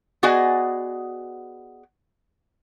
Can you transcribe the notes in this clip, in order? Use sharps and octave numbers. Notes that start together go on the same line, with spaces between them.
B3 F#4 G#4 D5 D#5 G#5